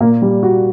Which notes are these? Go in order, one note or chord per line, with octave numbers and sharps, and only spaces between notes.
A#2 A#3
G3
F#4